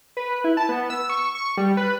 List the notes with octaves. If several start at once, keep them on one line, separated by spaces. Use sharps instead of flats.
B4
E4
A5
B3
E6
C#6
C#6
G3
B4